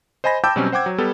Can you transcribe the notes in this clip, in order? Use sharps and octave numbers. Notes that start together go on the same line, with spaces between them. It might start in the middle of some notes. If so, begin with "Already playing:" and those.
C5 D#5 G#5 B5 A#6
G5 A5 B5 D6 E6 G6
B2 F#3 G3 C4 C#4
C5 F#5 G5 D6 G#6
F#3
G3 B3 A4